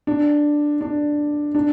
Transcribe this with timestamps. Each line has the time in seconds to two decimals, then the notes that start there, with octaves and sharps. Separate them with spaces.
0.07 D4
0.81 D4
1.55 D4